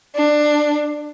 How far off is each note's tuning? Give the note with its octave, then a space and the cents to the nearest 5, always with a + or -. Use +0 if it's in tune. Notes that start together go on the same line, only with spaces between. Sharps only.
D4 +20